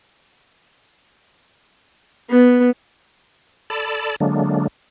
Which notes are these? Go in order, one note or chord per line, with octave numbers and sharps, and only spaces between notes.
B3
A4 D5 A5 B5
D3 F#3 G#3 A#3 D4